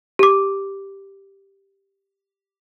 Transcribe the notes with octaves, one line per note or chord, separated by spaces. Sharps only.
G4 D6